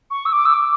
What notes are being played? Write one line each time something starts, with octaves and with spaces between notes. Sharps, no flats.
C#6
E6
D6
E6
D6